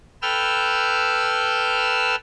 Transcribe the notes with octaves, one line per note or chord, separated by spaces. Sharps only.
A4 B4 G5 E6 F6